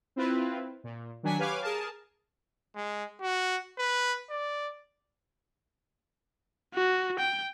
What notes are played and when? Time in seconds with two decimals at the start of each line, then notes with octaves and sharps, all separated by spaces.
0.16 C4 E4 F4 B4
0.84 A#2
1.23 D#3 F#3 D4 F#5 G#5 B6
1.38 G4 B4 C#5 F5 G#5 D6
1.62 G#4 A#4 A5
2.76 G#3
3.22 F#4
3.78 B4
4.30 D5
6.74 F#4
7.20 G5